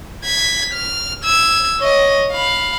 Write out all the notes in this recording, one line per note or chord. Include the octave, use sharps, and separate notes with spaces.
G#6 B6
F6
E6 G#6
C#5 D#5
F5 B5